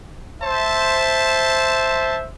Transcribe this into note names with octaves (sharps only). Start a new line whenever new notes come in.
C5 E5 A5